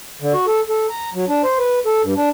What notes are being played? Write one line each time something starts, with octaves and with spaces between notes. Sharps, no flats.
D3
F#4
A4
A4
A#5
F#3
D4
C5
B4
A4
G2
D4